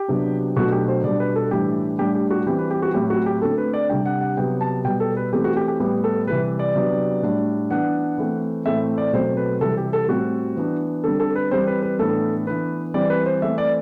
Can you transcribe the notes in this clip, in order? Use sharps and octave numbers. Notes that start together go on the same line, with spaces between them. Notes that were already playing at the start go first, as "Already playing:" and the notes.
Already playing: G4
C3 F#3 B3 D4
B2 F#3 A3 D4 F#4
G4
C5
B2 G3 D4 D5
B4
A4
A2 E3 G3 D4 G4
A2 G3 D4 G4
G4
F#4
E3 G3 C4 G4
B4
G4
F#4
A2 F#3 C4 G4
F#4
G4
D3 A3 C4 A4
B4
D5
C3 G3 D4 G5
F#5
F#5
C3 F#3 B3 G5
A5
B2 G3 B3 G5
A4
B4
E3 A3 C4 G4
F#4
G4
G4
A2 G3 B3 G4
A4
C3 E3 G3 B4
D5
C3 F#3 B3 D4
A2 G3 D4
E3 B3 D4 F#5
E3 A3 C4
A2 E3 A3 C4 E5
D5
B2 F#3 A3 C4 C5
B4
C3 E3 G3 A4
G4
A4
A2 G3 C4 F#4
E3 B3 D4
D3 G3 C4 A4
A4
B4
E3 G3 C4 C5
B4
B4
A2 E3 B3 D4 A4
E3 B3 D4 B4
E3 G3 C4 D5
B4
C5
E3 A3 C4 E5
D5